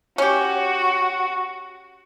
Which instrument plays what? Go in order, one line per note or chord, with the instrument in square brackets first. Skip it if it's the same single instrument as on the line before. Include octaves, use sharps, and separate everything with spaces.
[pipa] C#4 G4 [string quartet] F#4